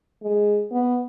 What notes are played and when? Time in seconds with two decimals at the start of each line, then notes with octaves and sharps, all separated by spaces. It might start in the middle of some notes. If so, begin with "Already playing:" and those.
0.22 G#3
0.72 B3